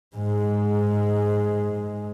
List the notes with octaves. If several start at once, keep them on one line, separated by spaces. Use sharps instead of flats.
G#2 G#3